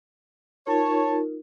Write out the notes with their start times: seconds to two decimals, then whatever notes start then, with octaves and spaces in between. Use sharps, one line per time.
0.67 D#4 F4 A#4 C#5 A5